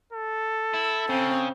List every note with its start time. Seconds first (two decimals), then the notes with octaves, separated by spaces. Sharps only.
0.13 A4
0.74 E4
1.10 C#3 C4